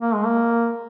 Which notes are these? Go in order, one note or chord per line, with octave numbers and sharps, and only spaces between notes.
A#3
G#3
A#3